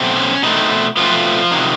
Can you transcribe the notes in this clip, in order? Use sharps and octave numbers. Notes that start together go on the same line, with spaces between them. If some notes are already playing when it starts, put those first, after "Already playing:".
Already playing: B2 F#3 A3 C4
C#4
B2 D#3 F#3 A3 C4 D#4
B2 F3 F#3 A3 C4 F4
C3 D#3 F#3